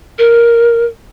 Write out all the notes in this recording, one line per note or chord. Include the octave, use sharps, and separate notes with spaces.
A#4